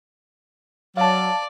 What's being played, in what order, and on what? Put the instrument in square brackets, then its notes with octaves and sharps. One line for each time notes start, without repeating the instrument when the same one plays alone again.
[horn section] F#3 [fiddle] D5 [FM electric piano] F5 A5